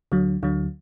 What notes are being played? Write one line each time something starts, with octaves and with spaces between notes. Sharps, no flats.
D2 D3 F#3
D2 D3 F#3